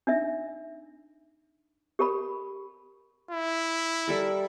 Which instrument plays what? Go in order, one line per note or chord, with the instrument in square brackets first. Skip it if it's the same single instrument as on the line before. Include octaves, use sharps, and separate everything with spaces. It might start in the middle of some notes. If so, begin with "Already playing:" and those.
[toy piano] D4 D#4 E5
G4 A#4 B5
[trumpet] E4
[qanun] G3 A4 A#4